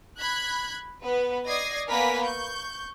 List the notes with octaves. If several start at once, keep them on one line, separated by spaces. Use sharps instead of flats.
B5 F#6 G#6
B3 B4
D5 D#5 D#6 G#6 A#6 C7
A#3 B3 A#4 B4 G#5 B6
C#6 G6